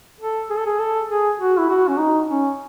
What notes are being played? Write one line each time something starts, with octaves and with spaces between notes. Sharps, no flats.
A4
G#4
A4
G#4
A4
G#4
F#4
E4
F#4
C#4
D#4
C#4